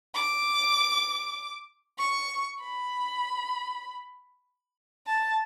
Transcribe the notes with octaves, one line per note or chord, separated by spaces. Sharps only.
D6
C#6
B5
A5